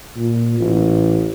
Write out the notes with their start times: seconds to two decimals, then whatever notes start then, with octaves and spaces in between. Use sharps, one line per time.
0.17 A#2
0.60 A1